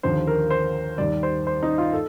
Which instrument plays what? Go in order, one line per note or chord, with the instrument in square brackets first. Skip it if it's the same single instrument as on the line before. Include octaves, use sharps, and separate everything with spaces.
[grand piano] D#2 D3 F3 C5
A#4
C5
D#2 D#3 G3 D5
C5
C5
D#4
F4
A4